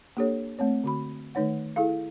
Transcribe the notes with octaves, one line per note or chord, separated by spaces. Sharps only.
A#3 D4 G4 A4 C#5
A3 C4 C#5
D3 F#4 B5
D#3 A3 D#4 C#5 F#5
E4 G#4 A4 F5